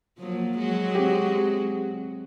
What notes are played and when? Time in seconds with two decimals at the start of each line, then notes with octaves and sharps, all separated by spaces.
0.18 F3 F#3 A#3
0.57 F#3 G#3 F#4
0.95 C4 G4